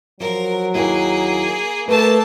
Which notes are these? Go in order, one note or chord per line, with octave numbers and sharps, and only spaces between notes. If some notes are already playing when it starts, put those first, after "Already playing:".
F3 F#3 A#4
D#2 A#3 E4 G#4 G5
A3 A#3 B4 A5